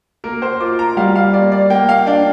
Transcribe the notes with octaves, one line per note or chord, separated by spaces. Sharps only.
A#3 A#4
C5
F4 D6
A#5
G3 F5
F5
A#3 D5
D5
A#3 G5
F5
D4 G5